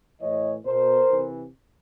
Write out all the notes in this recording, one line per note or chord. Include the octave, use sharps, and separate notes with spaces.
A2 E3 C#5 D#5
B2 A#4 C5
C3 E3